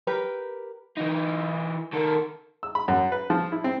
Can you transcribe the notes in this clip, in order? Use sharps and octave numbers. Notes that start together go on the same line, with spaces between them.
G4 A#4 B4
E3 D#4
D#3 A4 A#4
E6
B5
F#2
B4
F3
E4
C4